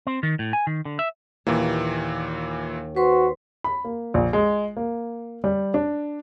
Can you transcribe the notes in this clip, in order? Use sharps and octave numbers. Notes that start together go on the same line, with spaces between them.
C4
D#3
A2
G#5
D#3
D3
E5
D#2 A#2 E3
F#4 B4 C5 C6
B5
A#3
A#1
G#3
A#3
G3
D4